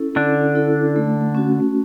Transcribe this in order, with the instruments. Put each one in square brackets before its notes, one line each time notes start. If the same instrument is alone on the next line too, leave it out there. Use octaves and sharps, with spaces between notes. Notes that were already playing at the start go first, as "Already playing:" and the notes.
Already playing: [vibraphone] C#4 E4 A4
[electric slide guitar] D3 D4 [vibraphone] C#4
[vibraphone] E4 A4
A3
C#4 F#4